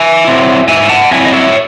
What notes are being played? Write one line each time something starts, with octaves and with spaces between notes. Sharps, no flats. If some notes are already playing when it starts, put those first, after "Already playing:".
Already playing: E5 G#5
F#3 C4 E4
G#2 E5 G#5
F#5 A5
F#3 C4 E4 E5 G#5
D#5
C#5 E5